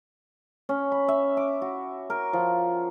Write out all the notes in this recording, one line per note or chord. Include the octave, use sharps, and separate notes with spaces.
C#4
B5
E5
D6
F#4
A#4
F3